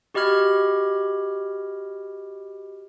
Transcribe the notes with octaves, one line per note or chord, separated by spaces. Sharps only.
F#4 G4 D#5 B5 F6 G#6